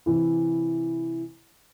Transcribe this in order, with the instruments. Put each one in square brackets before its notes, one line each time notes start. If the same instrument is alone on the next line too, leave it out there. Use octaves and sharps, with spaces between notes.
[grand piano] C3 E3 E4